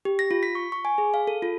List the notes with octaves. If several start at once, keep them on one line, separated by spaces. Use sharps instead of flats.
G4
A#6
F4
B6
C#6
C#6
G#5
G#4
F5
A4
F4